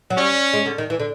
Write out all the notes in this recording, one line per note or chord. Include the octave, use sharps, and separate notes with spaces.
F#3
G3 C#4
G#3
D3
D#3
E3
D3